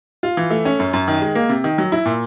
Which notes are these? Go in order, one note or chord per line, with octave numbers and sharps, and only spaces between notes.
F4
E3
A3
C#4
F#2
F#2
D#3
G#3
A#3
C3
D#3
F#3
E4
A#2